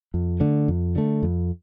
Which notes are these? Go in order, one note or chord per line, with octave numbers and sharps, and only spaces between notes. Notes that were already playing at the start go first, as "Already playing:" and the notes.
F2
D3 A3
F2
D3 A3
F2